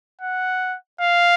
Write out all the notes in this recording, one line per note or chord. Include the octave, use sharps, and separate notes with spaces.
F#5
F5